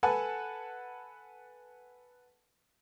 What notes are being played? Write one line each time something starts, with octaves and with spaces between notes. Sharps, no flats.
A4 B4 F#5 G#5 A5